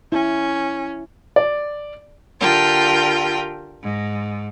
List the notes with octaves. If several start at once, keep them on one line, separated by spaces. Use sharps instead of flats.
C#4 E4
D5
D3 F4 G4 A#4 G5 A5
G#2